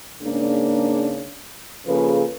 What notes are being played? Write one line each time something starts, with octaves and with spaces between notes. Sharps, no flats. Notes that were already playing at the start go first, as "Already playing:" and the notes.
G#2 C#3 A#3 D4
C#3 F3 A#3 G#4 A4 B4